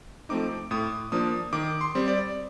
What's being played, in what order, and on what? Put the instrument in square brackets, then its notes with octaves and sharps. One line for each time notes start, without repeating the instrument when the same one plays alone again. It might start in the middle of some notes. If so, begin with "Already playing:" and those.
[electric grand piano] F3 A3 C4 D#4 D6
A2 D#6
F3 A#3 D4 D#6
D#3 D6
C6
G3 C4
D5